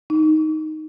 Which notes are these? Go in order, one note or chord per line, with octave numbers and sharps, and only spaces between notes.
D#4